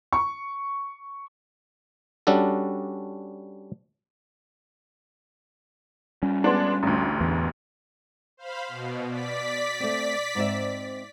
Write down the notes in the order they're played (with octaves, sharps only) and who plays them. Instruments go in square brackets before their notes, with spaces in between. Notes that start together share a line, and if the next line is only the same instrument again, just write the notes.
[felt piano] C#6
[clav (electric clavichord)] G3 C#4 D4 F#4 A4
[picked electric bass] G3 C#4
[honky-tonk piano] G#3 B3 D4
A1 D2
[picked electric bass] E2 E3
[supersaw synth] C5 F5 B5
B2
D5 B6
[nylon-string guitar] A3 C4
G#2 C4 E5